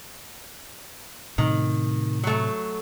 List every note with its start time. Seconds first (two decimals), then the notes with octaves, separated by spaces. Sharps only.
1.38 A2 C3 D#3
2.24 F#3 A3